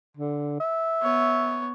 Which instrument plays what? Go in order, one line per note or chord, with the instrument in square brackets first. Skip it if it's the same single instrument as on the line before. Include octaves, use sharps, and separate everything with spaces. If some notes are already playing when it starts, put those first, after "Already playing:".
[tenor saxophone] D3
E5
[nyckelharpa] B3 C#5